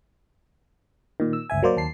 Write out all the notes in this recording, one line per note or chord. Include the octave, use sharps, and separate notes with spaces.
A#2 D#3
E6
G1 C#2 E5 G#5
F#3 A#3 C5 D5
D#2 A5 C7